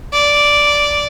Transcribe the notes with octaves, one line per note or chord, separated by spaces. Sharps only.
D5